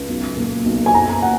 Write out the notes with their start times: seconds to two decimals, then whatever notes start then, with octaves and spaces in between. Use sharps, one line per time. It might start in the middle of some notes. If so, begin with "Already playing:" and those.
Already playing: C#2
0.08 B1
0.36 A#2
0.65 B1
0.86 G#5
0.94 F#1 A#5
1.22 F#5